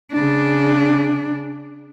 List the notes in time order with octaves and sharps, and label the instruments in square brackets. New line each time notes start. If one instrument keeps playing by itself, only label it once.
[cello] C#3 D4